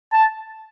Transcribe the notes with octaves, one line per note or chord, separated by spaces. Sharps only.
A5